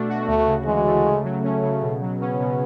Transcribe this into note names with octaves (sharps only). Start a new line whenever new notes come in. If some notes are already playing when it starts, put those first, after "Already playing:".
Already playing: B2 A3 D4
F#4
D2 A3
C#3
E3 G#3
A3
C#3
F#3
A3 C#4
C#3
B2
F#3
B3 C#4
B2